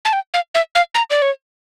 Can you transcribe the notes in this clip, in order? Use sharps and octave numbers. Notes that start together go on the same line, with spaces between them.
A5
G5
F5
E5
F5
A#5
D5
C#5